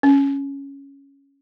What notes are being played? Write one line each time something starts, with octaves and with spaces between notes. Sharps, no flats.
C#4